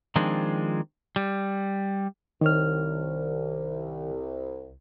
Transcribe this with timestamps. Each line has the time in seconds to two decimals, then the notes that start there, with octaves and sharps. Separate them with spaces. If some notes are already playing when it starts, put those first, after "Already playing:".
0.16 D#3 F3 G#3 C4 D4 F4
1.16 G3
2.41 C2 D#3 C#5 F6